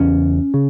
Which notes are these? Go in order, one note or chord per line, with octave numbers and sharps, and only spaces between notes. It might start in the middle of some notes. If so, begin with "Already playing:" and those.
Already playing: E2 C#3 C#4
C#3